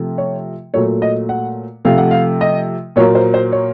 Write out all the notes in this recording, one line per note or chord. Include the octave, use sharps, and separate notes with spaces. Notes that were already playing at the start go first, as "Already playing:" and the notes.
Already playing: C3 F3 A3
C#5
A#2 F#3 A3 C#5
D#5
F#5
C3 F3 A3 F5
F#5
F5
D#5
A#2 F#3 A#3 C#5
C5
C5
C#5